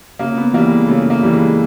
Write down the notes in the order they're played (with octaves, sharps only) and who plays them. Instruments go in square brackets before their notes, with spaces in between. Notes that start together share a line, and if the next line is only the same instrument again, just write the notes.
[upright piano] C#3 A#3
B3
E3 G3 A#3
G#3
C#3 A3
A#3
E3 G3
G#3